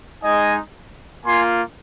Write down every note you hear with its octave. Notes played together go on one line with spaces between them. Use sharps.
G#3 D#4 D#5 G#5
A#3 F4 G#5 C6